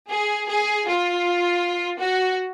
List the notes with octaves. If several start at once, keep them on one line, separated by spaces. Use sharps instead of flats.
G#4
G#4
F4
F#4